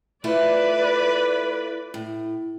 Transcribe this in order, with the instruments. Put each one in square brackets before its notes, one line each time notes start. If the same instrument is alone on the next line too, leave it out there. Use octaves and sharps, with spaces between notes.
[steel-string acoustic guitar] A3 E4 F4 [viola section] B4 D5
[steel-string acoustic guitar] A2